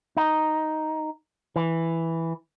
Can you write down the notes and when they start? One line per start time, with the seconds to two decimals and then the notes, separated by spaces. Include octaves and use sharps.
0.17 D#4
1.56 E3